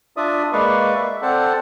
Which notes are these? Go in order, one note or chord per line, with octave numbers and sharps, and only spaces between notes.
D4 F4 D5 E5 D#6
G#3 A#3 B4 D5 F5 C#6
E5
C4 A4 C5 D5 F#5 A5